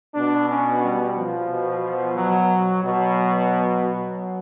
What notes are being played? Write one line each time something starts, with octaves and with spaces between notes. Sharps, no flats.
B2 D4
C#4
G3
F3
B2
F3
F#3
B2 F#3
F#3